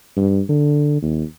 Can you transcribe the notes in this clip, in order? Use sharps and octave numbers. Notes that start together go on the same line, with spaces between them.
G2
D3
D#2